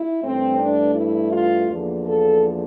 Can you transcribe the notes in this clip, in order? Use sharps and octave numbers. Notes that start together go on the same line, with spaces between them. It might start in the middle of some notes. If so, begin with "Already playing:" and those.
Already playing: E4
G2 E3 A3 C4
D4
E4
F4
E2 D3 F3 A#3
A4